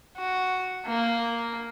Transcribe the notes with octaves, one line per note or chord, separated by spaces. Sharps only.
F#4
A#3